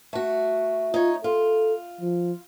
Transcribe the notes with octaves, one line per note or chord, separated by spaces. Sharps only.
A3 F#4
D#4 F4 C#5
F4 A4
F3